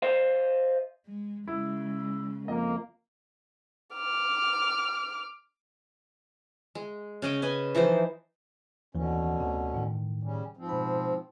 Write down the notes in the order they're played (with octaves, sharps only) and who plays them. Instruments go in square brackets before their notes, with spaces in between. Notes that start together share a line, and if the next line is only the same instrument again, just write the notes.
[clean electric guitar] C5 D#5 F5
[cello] G#3
[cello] C#3 G#3 [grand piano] E4
[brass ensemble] F2 A#3 [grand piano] D#5
[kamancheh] D6 F6
[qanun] G#3
C#3 C#4 D#5 G5
C#4 B4 D#5 G#5
E3 F3 D#4 C5
[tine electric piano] D#2 E3 [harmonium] B2 D3 C#4
[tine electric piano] D2 C3
A2 D#3
[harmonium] C#3 G3 C#4
G#2 F3 C4
[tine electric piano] B2 B5